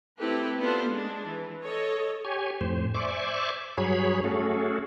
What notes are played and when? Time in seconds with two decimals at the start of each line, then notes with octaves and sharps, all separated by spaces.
0.20 A3 C4 E4 G4 A4 B4
0.60 B3 D4 F4 A4 C5
0.90 G#3 D4
1.28 E3
1.64 A4 C#5 D#5
2.25 G4 C#5 G#5
2.61 F2 A2 C5
2.94 C5 D5 E5 G#5 C#6 D6
3.78 G2 F#3 G#4 C#5 B5
4.24 A3 C#4 F#4 G#4 A4